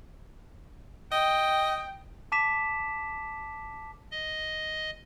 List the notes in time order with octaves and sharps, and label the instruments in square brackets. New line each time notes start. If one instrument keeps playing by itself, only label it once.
[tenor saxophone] D#5 [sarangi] G5
[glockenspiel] A5 D6 B6 E7
[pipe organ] D#5